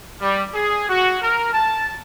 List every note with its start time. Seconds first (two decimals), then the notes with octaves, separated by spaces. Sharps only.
0.21 G3
0.55 G#4
0.89 F#4
1.22 A#4
1.53 A5